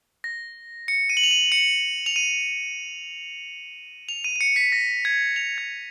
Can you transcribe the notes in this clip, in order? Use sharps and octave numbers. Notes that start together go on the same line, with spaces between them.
A#6
C#7
D#7
F#7
F7
D#7
C#7
F7
D#7
F7
D#7
D#7
C#7
B6
A#6
G#6
F7
G#6